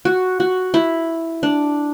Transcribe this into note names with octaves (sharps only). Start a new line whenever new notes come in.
F#4
F#4
E4
D4